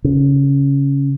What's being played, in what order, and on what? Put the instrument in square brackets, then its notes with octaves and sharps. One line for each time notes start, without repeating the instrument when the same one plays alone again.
[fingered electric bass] C#3